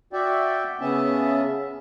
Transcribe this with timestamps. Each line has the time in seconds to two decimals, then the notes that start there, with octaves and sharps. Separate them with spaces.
0.13 F#4 D5 E5 G5
0.81 C#3 B3 C#4 G#4 E5 A5